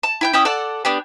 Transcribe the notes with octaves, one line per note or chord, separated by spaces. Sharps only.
A5
E4 G5 G6
C#4 E4 G5 D#6
A4 D5 F#5 A5
B3 D4 G4